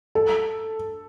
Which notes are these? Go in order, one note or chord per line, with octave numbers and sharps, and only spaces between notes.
A4